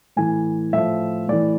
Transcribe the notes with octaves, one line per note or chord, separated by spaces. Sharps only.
A2 E3 G#5
A2 F3 E5
A2 E3 D5